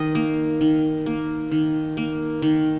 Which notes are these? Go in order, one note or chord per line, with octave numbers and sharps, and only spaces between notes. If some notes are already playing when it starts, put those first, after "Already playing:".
Already playing: D#3 D#5
A#3
D#3
A#3
D#3
A#3
D#3